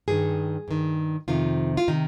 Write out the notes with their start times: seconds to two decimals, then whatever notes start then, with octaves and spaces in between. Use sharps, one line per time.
0.08 G2 D#3 G#4
0.68 G2 D#3
1.28 F2 C3 D#3 F4
1.77 F4
1.88 C3 D#3 D#4